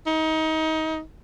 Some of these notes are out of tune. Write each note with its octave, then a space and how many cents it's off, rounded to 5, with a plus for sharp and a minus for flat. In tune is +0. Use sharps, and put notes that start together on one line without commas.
D#4 +25